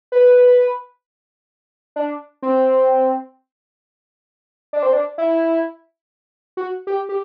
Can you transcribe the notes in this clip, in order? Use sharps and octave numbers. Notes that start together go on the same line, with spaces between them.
B4
D4
C4
D4
C4
D4
E4
F#4
G4
G4